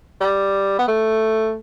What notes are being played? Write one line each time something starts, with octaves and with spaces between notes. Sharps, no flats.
G3
B3
A3